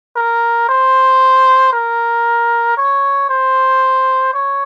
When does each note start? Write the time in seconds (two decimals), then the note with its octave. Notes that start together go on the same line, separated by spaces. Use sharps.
0.16 A#4
0.69 C5
1.73 A#4
2.77 C#5
3.29 C5
4.33 C#5